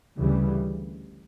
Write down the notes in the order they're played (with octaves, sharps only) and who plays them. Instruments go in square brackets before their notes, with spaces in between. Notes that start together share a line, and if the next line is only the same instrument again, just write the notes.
[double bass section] D2 C#3 E3 G3